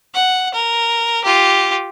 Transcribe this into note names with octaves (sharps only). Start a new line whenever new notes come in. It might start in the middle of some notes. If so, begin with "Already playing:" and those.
F#5
A#4
F4 G4